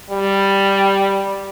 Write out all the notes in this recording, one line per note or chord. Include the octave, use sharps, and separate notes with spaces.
G3